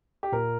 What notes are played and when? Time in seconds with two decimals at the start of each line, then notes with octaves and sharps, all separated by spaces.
0.23 G4
0.32 A#2 A#4